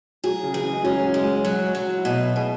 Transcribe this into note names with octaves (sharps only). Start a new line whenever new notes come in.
F#3 G#4
C#3
E3 G#4
G#3
F#3 C#4
F#4
G#3
G#4
G#4
F#3 F#4
F#3
F#4
E4
B2 F#4
B2 G#4